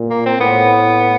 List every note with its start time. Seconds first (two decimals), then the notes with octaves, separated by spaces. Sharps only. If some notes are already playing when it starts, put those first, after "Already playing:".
Already playing: A#2
0.10 A#3
0.26 C4
0.41 A2 B3